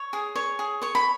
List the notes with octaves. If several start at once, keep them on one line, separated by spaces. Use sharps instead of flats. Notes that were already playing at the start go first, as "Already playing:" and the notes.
Already playing: C#5
G#4
C#5
G#4
C#5 C#6
B5